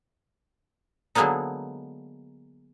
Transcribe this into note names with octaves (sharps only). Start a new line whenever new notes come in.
D3 F#3 G#3 A#3 B3 D#4